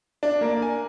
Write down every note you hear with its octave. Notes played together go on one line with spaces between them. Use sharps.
D4
A#3
G#5